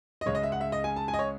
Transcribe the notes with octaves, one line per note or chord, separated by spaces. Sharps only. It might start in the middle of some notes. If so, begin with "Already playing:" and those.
D#5
C#2 C#3 G#3 C#5
D#5
E5
F#5
E5
D#5
G#5
A5
G#5
D#5
C#5